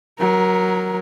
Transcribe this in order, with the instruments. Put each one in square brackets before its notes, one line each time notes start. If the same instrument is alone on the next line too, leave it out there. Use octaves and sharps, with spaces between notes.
[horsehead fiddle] F#3 A#4